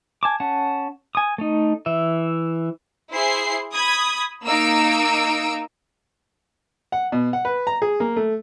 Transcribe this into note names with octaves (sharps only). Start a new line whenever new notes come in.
G#5 A5 D6
C#4 F#5 A5
G#5 D#6
A3 D#4
E3 E5
E4 G#4 C5 C7
B5 D#6 G#6
A#3 D#4 E6 D7
F#5
B2
F#5
B4
A#5
G#4
A#3
A3